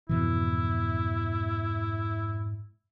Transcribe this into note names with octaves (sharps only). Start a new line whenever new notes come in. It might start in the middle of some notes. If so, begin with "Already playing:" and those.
F2 G#2 B2 E3 E4